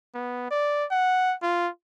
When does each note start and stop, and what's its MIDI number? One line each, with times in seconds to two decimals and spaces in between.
0.15 0.50 59
0.51 0.85 74
0.91 1.35 78
1.43 1.69 65